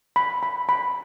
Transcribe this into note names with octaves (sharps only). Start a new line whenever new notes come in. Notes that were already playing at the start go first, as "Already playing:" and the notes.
B5
B5
B5